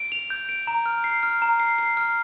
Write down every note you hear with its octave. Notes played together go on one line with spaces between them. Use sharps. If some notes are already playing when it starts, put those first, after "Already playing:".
Already playing: D7
F7
G6
D7
A#5
F6
C7
F6
A#5
C7
C7
F6